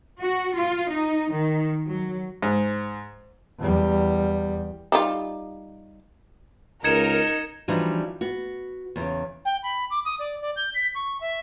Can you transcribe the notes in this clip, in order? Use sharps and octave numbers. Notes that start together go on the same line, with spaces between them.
F#4
F4
D#4
D#3
F#3
G#2
E2 G3
G3 D#4 F4
C#2 D#4 A#4 G#6 C#7 E7
E3 F3 G3 D4 D#4 F#4
B3 F#4
E2 C#3
G5
B5
D6
D#6
D5
D5
G6
B6
C#6
E5